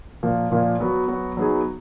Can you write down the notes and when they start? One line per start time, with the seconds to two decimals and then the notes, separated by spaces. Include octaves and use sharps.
0.23 A#2 F3 A#3
0.51 A#2 F3 A#3
0.80 F#3 B3 F#4
1.08 F#3 B3 F#4
1.37 F#3 B3 D#4 G#4